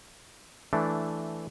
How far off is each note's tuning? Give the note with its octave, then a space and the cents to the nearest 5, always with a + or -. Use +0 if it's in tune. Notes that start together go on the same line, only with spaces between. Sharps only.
E3 +0 A3 -10 D4 +0